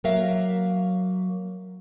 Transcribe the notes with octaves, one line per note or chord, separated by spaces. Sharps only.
F#3 A#3 A#4 E5 F5